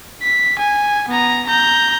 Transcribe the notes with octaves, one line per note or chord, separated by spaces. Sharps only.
B6
G#5
B3 A#5
A#5 G6